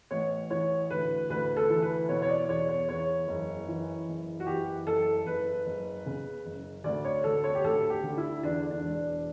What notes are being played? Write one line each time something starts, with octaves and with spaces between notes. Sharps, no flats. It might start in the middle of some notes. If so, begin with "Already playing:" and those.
A1 C#5
E3 C#5
D2 B4
D2 B4
A4
E3
B4
B2 C#5
C#5
D5
E2 C#5
C#5
E2 C#5
F#1
E3
F#1
F#4
E3 G4
F#1 A4
F#1 B4
F#1
C#3
F#1
D2 D5
C#5
D2 A4
C#5
G4
D2 A4
G4
D3
E4
E2 D4
D4
E1